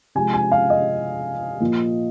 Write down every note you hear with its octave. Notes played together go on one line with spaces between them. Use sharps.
C3 F3 G#3 G#5
G#5
F5
D#5
A#2 F3 A#3